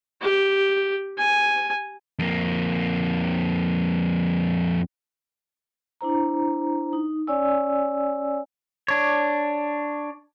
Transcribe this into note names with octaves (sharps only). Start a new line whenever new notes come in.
G4
G#5
F2 A#3
D4 E4 C5 A#5
D#4
C#4 C#5 D5 G#5 E6
D4 C#5